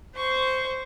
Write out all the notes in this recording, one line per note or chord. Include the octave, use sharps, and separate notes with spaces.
C5 C#6